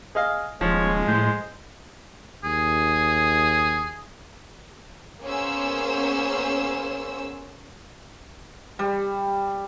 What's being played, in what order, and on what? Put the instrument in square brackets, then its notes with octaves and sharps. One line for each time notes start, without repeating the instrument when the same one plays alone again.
[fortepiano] G#4 D#5 F5
[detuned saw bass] D#1 [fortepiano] F3 [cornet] G#3 [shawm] C#5
[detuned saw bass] A2 [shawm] C5
[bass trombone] D#2 [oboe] G#4
[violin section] A#3 B3 C#4 G#4 C5 E6
[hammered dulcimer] G3